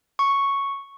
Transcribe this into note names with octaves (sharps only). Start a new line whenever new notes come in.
C#6